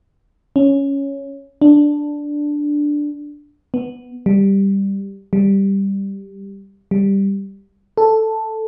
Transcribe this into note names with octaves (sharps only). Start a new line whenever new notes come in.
C#4
D4
B3
G3
G3
G3
A4